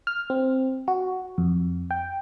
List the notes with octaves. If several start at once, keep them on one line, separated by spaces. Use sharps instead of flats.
F6
C4
F#4
F2
G5